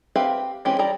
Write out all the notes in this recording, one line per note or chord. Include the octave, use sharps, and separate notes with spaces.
C4 G4 B4 E5 F5
E3 G#3 C4 C#4 G4
G3 E4 G4 D5 A#5